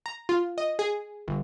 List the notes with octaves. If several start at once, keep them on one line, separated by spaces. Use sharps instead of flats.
A#5
F4
D#5
G#4
G1